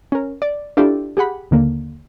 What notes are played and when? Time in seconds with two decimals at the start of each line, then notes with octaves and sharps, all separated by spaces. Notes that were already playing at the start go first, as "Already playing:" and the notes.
0.12 C#4 A#4
0.42 D5
0.77 D4 E4 F4 G4 A4 D5
1.17 G4 G#4 F#5 B5
1.51 D#2 D3 A#3